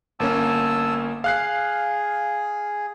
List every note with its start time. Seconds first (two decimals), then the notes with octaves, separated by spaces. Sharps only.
0.20 G1 A#3 C#4 A5 D#6 E6
1.24 G#4 F5 F#6 C7